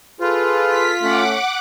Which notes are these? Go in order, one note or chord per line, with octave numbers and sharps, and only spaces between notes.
F4 G#4 A4 B4
B6
A3 C#4 F#5 D6